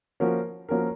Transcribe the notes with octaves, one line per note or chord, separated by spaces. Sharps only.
F3 A#3 C#4 F#4 A#4
F3 A#3 C#4 F#4 A#4